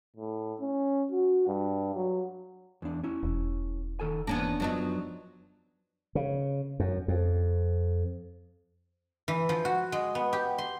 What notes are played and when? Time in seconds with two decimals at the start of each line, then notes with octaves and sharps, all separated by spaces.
0.17 A2
0.61 C#4
1.12 F#4
1.47 G2
1.95 F#3
2.82 E2 D4
3.04 C#4 E4
3.23 E1
4.00 D#3 A4 G#5
4.27 E2 A#3 B3 C#4 D4
4.60 F#2 F3 F#3 B3 D4 D#4
6.15 C#3
6.80 F#2
7.08 F2
9.28 E3
9.49 F3
9.65 F#4
9.92 G#3
10.15 B3
10.33 G4
10.58 C6